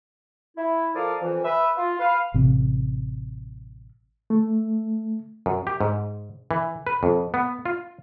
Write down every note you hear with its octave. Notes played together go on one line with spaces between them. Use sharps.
E4
F3 A4 A#4 D5 F5 D#6
F2 E3
B4 E5
F4
B4 F5
A1 C3
A3
F#2
G4
G#2
E3
B4
F2
B3
F4